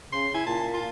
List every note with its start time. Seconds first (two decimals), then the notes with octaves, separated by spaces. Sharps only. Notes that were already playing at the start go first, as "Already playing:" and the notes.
0.12 C#3 C6
0.34 E4 G#5
0.46 A#2 A5
0.74 F4